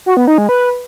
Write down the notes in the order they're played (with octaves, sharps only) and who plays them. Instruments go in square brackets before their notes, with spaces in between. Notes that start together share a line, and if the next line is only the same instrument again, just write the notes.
[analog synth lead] F#4
B3
D#4
G#3
B4